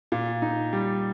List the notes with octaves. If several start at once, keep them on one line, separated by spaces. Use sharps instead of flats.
A#2
D#4
G3